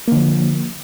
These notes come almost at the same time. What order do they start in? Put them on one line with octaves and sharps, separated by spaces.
A#3 D3 F3